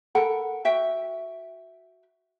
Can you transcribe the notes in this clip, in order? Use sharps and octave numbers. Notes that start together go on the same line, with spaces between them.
A4 A#4 F#5 B5
F#4 E5 G5